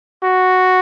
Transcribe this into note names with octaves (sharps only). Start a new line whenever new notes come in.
F#4